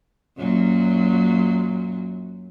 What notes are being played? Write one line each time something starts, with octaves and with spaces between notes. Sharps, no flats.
F#2 A#2 F#3